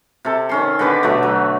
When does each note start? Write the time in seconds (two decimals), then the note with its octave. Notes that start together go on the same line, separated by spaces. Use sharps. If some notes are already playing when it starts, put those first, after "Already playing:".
0.25 C3 A4
0.49 D#3 C#4 C6
0.79 D3 B3 G4 B4
1.03 B2 F#3 A3
1.23 F#3